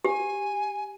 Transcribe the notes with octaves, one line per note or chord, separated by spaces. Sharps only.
G4 G#5